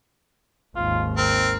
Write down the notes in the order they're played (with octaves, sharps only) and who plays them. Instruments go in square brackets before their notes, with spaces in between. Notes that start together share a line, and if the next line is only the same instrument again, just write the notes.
[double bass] G#1 D#2 [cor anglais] F4
[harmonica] C4 [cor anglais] A#4